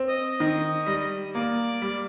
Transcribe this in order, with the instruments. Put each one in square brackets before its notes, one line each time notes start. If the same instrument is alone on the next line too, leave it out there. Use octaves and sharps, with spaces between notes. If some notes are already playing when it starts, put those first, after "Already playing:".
Already playing: [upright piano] C4
[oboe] D#5
[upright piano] D#3 [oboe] D#5
[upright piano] G3
[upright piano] A#3 [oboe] D5
[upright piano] G3